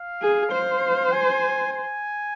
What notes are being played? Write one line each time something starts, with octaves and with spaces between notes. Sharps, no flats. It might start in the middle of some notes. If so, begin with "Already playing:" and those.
Already playing: F5
G#4
C5
G#5
G#5